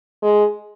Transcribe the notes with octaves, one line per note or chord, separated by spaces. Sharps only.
G#3